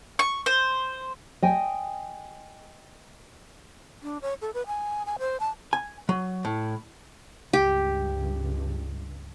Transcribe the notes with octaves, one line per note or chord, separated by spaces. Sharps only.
C#6
C5
D#5 G5 G#5
D4
C#5
A4
B4
G#5
G#5
C5
A5
G#5
F#3
A2
C#2 G2 G4